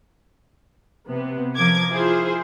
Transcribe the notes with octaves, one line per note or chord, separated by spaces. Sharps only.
C3 B3
F3 A#4 D6 G#6
E4 F4 G#4 C5